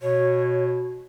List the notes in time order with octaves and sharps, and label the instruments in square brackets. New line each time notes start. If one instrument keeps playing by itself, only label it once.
[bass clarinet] B2 [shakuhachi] C#5